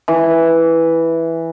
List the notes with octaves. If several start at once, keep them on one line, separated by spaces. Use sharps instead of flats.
E3